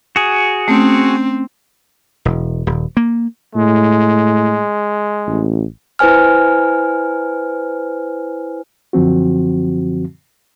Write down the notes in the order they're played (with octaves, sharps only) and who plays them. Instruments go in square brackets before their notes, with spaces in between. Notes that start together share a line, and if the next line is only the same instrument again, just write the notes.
[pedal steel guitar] F#4 G#4
[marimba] A3 C#4 [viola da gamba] C4
[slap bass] E1
D#1
A#3
[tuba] A2 [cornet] G#3
[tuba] A1
[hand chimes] E4 B4 C5 G#5 F6
[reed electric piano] F#2 D3 F3 C4 F#4